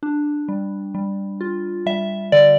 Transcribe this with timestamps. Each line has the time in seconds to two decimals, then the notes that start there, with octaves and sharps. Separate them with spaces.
0.03 D4
0.48 G3
0.95 G3
1.41 F4
1.86 G3 E5
2.32 D3 D5